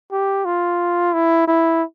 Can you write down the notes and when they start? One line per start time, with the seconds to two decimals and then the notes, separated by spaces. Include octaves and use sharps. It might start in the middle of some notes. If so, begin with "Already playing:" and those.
0.12 G4
0.45 F4
1.13 E4
1.47 E4